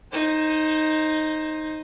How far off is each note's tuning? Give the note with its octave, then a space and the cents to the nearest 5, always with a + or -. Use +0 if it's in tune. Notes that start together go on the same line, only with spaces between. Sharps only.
D#4 +0 C5 +20